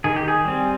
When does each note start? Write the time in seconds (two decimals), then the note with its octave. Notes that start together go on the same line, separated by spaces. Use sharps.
0.04 D#3 G#4
0.16 G4
0.28 G#4
0.45 G3 C4